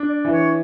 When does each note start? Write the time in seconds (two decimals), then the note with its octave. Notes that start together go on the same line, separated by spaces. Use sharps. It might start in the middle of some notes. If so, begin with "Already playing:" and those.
Already playing: D4
0.09 D5
0.25 E3
0.31 C#5